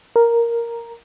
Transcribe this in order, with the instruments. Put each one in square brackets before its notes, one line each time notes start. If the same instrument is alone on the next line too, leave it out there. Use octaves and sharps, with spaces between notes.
[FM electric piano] A#4